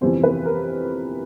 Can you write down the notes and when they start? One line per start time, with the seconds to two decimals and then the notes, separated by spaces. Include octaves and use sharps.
0.01 G1 F2 C3 E3 G3 C5
0.23 B4
0.46 A#4